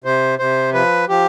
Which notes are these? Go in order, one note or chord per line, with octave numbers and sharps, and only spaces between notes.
C3 C5
C3 C5
F3 B4
F3 G4